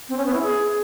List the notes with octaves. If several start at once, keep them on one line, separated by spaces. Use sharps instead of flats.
C4
C#4
B3
E4
G#4